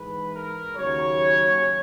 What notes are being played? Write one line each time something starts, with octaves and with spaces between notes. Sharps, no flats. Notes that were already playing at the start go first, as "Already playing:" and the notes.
Already playing: G#2 E3 G#3 B4
A#4
D#2 C#3 F#3 C#5